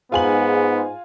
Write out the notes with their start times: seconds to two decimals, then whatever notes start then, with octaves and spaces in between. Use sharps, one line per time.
0.12 G#2 B3 F4 G#5 F#7